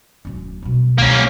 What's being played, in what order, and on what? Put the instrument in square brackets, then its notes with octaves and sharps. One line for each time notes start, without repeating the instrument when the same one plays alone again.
[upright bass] D1 C#4
B2 G3
[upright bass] C#2 F3 [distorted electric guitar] A#3 C#4